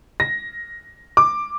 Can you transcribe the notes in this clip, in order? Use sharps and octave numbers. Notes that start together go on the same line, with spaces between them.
A#6
D6